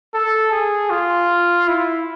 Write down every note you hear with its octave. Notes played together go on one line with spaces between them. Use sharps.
A4
G#4
F4
E4